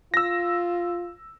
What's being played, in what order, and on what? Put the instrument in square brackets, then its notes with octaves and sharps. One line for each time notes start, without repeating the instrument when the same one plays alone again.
[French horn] F4 [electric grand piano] E6 A#6